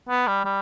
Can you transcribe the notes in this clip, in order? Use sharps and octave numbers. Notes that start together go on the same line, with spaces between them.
B3
G3
G3